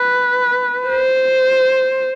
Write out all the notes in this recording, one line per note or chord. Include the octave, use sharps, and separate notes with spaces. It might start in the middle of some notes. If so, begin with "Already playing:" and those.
Already playing: B4
C5